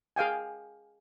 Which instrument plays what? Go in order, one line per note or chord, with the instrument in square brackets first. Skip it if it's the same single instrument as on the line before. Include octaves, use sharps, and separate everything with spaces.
[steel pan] G#4 F5 G5 G#5